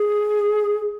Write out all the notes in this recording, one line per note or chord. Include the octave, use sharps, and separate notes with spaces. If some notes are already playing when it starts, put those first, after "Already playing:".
Already playing: G#4